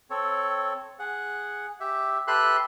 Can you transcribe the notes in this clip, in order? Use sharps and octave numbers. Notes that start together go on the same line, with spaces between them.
C4 A4 C#5
G#4 F#5
G4 E5
G4 A4 B4 E5 C6 F#6